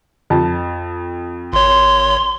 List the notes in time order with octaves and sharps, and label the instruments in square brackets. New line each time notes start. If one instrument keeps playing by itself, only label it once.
[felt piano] F2 A5
[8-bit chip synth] G#1 C#5 [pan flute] C6